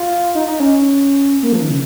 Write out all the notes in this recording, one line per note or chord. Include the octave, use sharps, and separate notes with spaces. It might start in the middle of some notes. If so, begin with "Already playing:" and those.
Already playing: F4
D#4
D#4
C#4
A#3
F3
D#3
C#3